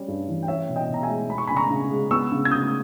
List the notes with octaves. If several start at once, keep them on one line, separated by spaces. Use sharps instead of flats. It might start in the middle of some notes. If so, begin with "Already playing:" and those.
Already playing: G3 C#4
G2
E3
G5
C#4 C#5 E5
B2
D#5 G5
B2
A#5
E5 G#5
G#3
B3 B5
C#6
C#3 G#5 B5
A#5 C#6
C#3
G#3
B3 C#6 E6
C#3
G#6
C#3 D#6 G6